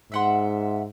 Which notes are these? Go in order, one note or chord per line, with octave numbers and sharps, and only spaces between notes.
G#2 E5 F#5 C6